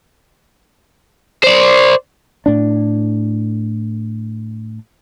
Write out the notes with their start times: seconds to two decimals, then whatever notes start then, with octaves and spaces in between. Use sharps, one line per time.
1.44 C5 D5
2.46 A2 D4